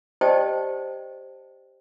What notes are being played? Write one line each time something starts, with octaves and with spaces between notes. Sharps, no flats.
G4 C5 D5 D#5 G5 A5